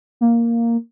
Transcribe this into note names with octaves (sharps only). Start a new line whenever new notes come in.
A#3